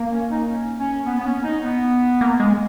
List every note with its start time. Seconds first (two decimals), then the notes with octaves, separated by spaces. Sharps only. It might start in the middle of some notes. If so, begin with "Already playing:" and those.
Already playing: A#3
0.10 C#4
0.30 D#4
0.49 C#4
0.78 C#4
1.06 B3
1.19 B3
1.25 C#4
1.44 D#4
1.63 B3
2.21 A#3
2.40 G#3